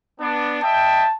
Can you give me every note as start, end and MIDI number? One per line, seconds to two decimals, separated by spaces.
0.20 0.62 59
0.20 0.62 62
0.63 1.03 75
0.63 1.03 76
0.63 1.03 79
0.63 1.15 81